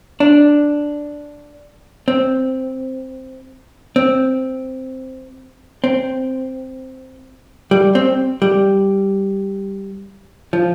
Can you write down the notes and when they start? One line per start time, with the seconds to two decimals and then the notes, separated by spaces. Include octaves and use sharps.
0.20 D4
2.08 C4
3.96 C4
5.84 C4
7.71 G3
7.95 C4
8.42 G3
10.53 F3